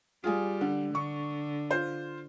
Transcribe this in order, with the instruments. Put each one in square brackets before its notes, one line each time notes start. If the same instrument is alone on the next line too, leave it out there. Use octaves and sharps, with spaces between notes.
[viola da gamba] G3 [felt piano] F4 G#4 G#5
[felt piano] D3
[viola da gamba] D3 [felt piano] C#6
[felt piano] F4 C5